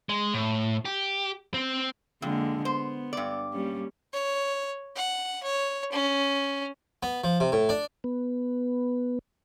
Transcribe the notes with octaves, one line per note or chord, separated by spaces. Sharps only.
G#3
A2
G4
C4
F2 D3 G#3 A#3
B3 C5
G2 D5
G3 A#3 C#4
C#5
F#5
C#5
C#4
B3
F3
C3
A2
D4
B3